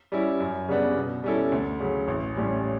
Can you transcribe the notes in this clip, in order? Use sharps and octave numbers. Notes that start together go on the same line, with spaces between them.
G3 C#4 E4
F#2
C#3 G3 B3 D4
B2
G3 C#4 E4 A4
D2
C#3 F#3
A1
A2 G3 C#4